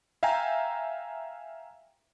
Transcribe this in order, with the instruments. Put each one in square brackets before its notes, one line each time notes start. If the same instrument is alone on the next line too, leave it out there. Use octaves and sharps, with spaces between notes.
[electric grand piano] E5 F5 G5 G#5 A#5